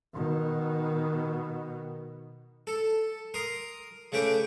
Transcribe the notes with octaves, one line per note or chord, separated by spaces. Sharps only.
B2 D#3
A4
A#4 C6 D#6
C#3 A3 B4 G5 D6